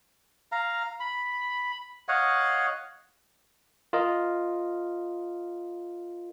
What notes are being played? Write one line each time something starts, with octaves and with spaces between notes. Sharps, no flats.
F5 A#5
B5
C#5 D#5 F5 F#5
F4 A#4 D#5